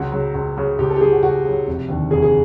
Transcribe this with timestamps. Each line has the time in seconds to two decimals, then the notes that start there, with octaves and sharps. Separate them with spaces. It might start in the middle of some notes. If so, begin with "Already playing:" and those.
Already playing: C#2 F#4
0.12 C#3 F#3
0.34 C#2
0.57 C#3 F#3
0.79 C#2 G4
0.90 A4
0.96 G4
1.01 C#3 F#3 G#4
1.12 F#4
1.22 C#2 F#4
1.45 C#3 F#3
1.67 F1
1.89 D#2 D3
2.11 F1 G#4
2.22 G#4